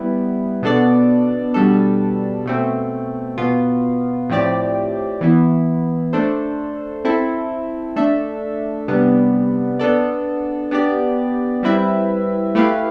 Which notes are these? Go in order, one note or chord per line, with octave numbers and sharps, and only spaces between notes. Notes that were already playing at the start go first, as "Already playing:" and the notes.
Already playing: G3 B3 E4
B2 B3 D4 A4 D5
B2 G3 D4 A4
B2 A3 C4
B2 B3 F4
A2 F3 C4 G4 D5
E3 B3 E4
A3 D4 A4 C5
C4 E4 A4
A3 D4 A4 E5
C3 G3 B3 D4
B3 D4 A4 D5
B3 D4 G4 D5
G3 C4 E4 B4 E5
A3 E4 G4 B4 F5